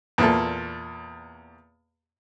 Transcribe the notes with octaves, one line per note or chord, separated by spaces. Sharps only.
E2 A#2 A4